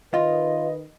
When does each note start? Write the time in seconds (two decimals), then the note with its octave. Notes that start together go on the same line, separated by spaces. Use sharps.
0.14 D#3 F4 B4 D#5